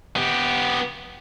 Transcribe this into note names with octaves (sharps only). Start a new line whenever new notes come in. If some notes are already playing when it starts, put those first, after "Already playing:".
B3 G4